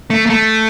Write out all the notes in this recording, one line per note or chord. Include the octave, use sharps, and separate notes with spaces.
A3
A#3
A3